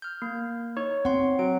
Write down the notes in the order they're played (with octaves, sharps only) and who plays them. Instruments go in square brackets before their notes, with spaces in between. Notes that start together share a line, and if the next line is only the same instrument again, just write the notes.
[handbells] F6 G6
A#3
[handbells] D#4 [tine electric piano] C#5
[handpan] C4 [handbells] F#5 C6
[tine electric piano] F#3 [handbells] D7